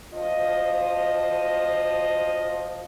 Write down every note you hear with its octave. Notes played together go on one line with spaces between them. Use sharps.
D2 F3 F4 D#5